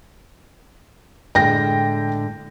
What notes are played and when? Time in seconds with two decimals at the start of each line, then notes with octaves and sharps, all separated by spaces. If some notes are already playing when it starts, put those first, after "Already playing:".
1.35 A2 D3 G#3 G5 A#6